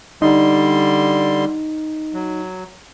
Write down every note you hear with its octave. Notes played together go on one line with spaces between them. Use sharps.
D3 G3 D#4 C6
F#3